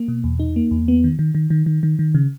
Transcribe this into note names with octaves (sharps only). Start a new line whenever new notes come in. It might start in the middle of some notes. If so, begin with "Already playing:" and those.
Already playing: A#3
B2
E2
D#4
A#3
E2
B3
D#3
D#3
D#3
D#3
D#3
D#3
D#3
C#3